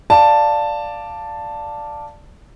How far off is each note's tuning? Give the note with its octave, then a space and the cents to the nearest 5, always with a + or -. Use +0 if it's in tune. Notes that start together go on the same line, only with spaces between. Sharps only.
D5 +0 F5 +0 A5 +5